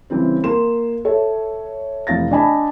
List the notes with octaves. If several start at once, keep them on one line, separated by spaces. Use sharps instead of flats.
C#3 E3 G3 C4 C5
A#3 C6 E7
A4 C#5 E5
F1 E3 F5 A6 A#6
D4 D5 D#5 G#5 A5 B5